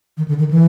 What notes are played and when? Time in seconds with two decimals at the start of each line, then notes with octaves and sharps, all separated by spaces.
0.17 D#3
0.28 D3
0.38 D#3
0.51 E3